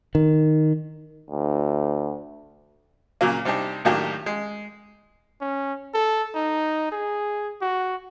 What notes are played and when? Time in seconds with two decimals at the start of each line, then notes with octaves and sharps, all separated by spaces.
0.15 D#3
1.30 D2
3.21 A#2 C#3 F#3 A#3
3.45 C3 G3 D4 D#4 G4
3.85 A2 D#3 F#3 A#3 D4 G4
4.26 G#3
5.41 C#4
5.94 A4
6.35 D#4
6.92 G#4
7.62 F#4